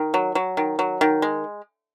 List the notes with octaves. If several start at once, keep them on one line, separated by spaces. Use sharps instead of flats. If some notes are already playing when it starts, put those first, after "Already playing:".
Already playing: D#3
F#3
F#3
D#3
F#3
D#3
G#3